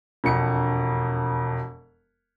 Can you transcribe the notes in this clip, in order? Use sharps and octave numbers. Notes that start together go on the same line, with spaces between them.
E1 F2 C#7